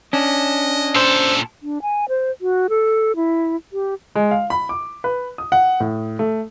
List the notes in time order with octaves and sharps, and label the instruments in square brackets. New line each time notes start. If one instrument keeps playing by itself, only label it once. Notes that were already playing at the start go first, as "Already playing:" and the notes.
[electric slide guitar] C#4 D4 [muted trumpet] D#5
[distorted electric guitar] A#2 A4 [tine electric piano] C5 E6
[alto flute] D4
G#5
C5
F#4
A4
E4
G4
[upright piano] G#3
F5
B5
D6
B4
D#6
F#5
A2
A3